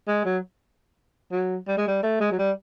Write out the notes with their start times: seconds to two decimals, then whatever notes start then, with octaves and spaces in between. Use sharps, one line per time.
0.08 G#3
0.25 F#3
1.32 F#3
1.68 G3
1.78 G#3
1.88 G3
2.03 A3
2.20 G#3
2.31 F#3
2.38 G3